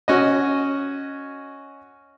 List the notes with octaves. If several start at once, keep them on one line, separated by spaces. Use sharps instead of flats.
C#4 F#4 D#5